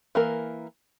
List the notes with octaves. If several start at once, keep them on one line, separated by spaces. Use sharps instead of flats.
E3 A#3 A#4